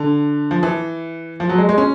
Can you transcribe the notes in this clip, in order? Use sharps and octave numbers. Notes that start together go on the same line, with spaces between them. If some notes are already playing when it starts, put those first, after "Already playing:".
Already playing: D3
F3
E3
F3
F#3
G#3
G#3
C#4